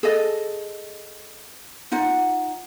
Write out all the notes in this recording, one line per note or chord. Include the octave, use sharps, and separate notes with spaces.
G#4 A4 D#5
D#4 F4 F#5